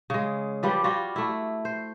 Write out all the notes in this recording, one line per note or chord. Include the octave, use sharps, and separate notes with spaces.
C#3 G#3
F3 G3 B4 D5
G3 F4 F#4
A3 E4
C5